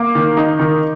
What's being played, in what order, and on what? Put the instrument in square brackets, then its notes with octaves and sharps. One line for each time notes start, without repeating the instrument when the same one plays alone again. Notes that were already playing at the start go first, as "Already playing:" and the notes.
Already playing: [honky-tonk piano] A#3 D6
D#3
D#4
D#3